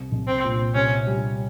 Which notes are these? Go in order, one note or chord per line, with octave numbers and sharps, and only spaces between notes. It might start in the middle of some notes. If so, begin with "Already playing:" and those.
Already playing: C2
C2
C4
A#2
C3 C#4
G3